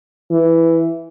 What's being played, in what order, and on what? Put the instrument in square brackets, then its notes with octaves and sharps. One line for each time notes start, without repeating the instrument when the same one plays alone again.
[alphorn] E3